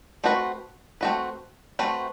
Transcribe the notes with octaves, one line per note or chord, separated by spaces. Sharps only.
A3 C4 F#4 B4
A3 C4 F#4 B4
A3 C4 F#4 B4